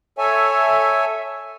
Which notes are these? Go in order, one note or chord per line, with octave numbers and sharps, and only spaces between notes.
A4 C#5 E5 G#5